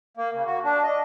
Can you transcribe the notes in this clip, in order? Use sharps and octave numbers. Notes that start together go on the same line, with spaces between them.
A#3
C#3
F#4
D4
D#5